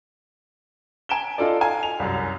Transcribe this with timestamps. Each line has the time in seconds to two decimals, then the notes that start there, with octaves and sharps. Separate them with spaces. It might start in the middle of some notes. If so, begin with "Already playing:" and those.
1.09 G#5 D7 E7 G7
1.38 D#4 F4 A4 D5
1.61 F5 G#5
1.83 F7
2.00 C2 F#2